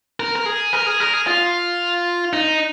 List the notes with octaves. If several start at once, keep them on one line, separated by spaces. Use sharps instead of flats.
A#4
A#4
G#4
A#4
G#4
A#4
G#4
F4
D#4